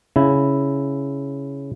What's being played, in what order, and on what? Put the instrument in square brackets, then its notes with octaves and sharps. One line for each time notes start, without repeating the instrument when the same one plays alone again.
[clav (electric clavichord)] C#3 E4